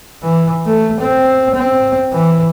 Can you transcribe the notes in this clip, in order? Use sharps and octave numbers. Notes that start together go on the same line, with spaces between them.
E3
A3
C4
C4
E3